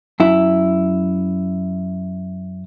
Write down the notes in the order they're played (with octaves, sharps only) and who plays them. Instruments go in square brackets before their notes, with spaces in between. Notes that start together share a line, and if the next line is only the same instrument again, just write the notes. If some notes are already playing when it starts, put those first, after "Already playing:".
[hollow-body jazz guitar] F#2 E4